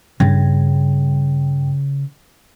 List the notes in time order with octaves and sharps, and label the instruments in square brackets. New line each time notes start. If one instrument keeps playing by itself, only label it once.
[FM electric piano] G2 [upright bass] C#3